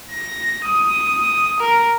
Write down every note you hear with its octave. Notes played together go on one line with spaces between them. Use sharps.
A#6
D#6
A#4